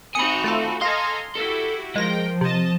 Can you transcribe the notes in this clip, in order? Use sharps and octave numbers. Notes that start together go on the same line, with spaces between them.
C4 D#4 F#4 G#5 B5 D#6 C#7
A3 F4 A4
A4 D#5 F5 G#5 A#5 C6
E4 F#4 G4 A4
F3 G#3 A#4 G5 A#6
C3 D#5 A5